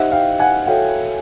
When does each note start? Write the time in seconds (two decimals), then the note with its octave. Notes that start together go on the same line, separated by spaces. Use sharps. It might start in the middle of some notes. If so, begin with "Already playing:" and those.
Already playing: D#4 G4 C5 D#5 E5 F#5
0.12 F5 G5
0.40 F#5 G#5
0.67 F#4 A4 C#5 E5 F5 G5